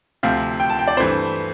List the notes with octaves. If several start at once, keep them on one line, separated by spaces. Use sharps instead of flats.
D2 C3 F3 C4 F5
G5
A5
G5
D5
G2 E3 A3 C4 C5